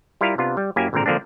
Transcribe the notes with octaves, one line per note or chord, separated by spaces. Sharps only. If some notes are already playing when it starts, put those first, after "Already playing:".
G3 E4 F4 A#4 F5
C3 B3 D4 F4
G3
F#2 A#3 C#4 E4 G4 G#5
G#1 A#2 D3 C4 A#4
D3 F3 A#3 C4 D4